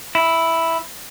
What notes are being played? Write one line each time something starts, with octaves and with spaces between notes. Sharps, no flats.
E4